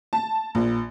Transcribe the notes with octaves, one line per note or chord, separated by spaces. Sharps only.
A5
A#1